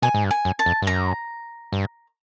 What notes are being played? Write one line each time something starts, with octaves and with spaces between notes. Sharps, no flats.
B2 G#5
G#2
G2
G#5
F#2
A5
F2
G2
F#2 A#5
G2